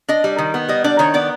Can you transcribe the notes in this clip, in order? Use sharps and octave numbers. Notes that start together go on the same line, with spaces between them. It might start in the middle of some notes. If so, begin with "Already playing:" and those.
D4 D#5
G3
D#3
B3
G3 D#5
D4 D5
D#3 C#5
B3 D5